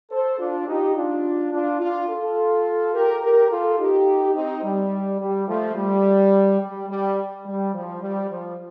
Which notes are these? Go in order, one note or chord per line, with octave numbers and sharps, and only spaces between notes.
A4 C5
D4 F4
D#4 G4
D4 F4
D4 F4
D4 F4
F4 A4
G4 A#4
G4 A#4
F4 A4
D#4 G4
C4 D#4
G3
G3
F3 A3
G3
G3
G3
G3
F3
G3
F3